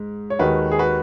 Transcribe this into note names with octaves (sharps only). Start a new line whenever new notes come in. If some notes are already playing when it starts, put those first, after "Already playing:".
Already playing: G#2
C#5
D#2 D#3 G#3 F#4 B4
G#4
F#4 B4